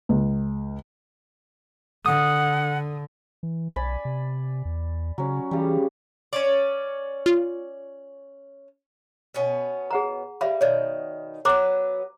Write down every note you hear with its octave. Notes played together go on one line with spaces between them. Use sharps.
C#2
D3 F#5 D#6
E3
B1 D5 G#5 B5
C3
E2
C#3 F#3 C#4
C#3 E3 G3
C#4 C#5 D5
F4
B2 B3 C#4
G#4 F#5 A#5
G3 E5 F5 B5
B2 D#3 C#5 D5
F#3 B3 C5 A#5 D6